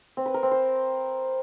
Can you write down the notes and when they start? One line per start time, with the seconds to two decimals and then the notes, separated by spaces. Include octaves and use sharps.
0.17 C4
0.26 B4
0.34 A#4
0.43 C4
0.51 C5